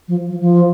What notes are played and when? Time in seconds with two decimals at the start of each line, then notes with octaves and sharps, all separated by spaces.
0.08 F3
0.30 F3
0.40 F3